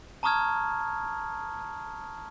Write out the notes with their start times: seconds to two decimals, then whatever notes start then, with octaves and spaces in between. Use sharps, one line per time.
0.23 A5 A#5 C#6 D#6 F6 G#6